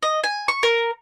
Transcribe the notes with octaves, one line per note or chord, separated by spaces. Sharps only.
D#5
G#5
C#6
A#4